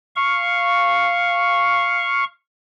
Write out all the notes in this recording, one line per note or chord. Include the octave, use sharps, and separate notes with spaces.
F5 C#6